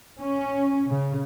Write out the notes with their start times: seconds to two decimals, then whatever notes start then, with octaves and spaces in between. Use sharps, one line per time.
0.20 C#4
0.88 C#3